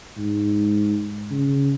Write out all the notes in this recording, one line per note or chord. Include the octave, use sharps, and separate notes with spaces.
G#2
C#3